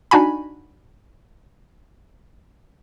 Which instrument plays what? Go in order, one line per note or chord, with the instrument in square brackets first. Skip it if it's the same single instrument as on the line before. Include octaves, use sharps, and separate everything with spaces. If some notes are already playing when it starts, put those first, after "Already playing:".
[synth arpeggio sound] D4 D#4 F#4 G#5 B5